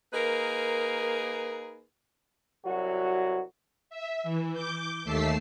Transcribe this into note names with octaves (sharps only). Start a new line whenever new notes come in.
A#3 D#4 G#4 A#4 B4
C2 F#3 F#4
E5
E3
D6 G6
D#2 A3 A5 E6 B6 C7